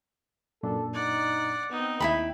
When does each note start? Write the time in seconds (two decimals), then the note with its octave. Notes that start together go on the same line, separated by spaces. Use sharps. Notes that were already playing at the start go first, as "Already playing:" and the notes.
0.63 F#2 A#2 D4 A4
0.94 D#4 D5 F#5
1.71 B3 C4 D#4
2.00 D#2 E4 A4 G5 B5